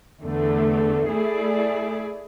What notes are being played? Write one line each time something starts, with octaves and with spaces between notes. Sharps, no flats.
E2 D3 A3
A3 E4 G#4 D5